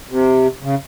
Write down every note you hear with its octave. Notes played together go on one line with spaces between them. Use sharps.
C3
C#3